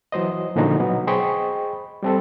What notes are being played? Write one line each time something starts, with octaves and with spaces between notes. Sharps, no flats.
E3 F#3 C5 D#5
A#2 D3 F3 C#4 D#4 F#4
B2 F#3 B3
G#4 C5 D#5 G5 B5 C#6
G3 C4 A4